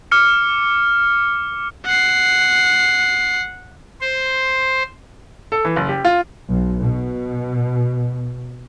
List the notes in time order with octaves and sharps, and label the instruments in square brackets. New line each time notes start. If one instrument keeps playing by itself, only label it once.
[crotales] D6 F6 C#7
[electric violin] F#5 C7
[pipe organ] C5
[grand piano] A4
E3
F#1
G4
F4
[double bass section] B1
B2